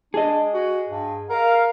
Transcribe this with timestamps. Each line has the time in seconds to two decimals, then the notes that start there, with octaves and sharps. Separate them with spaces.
0.14 D4 G#4 D#5
0.54 F#4
0.89 G2
1.30 A#4 F5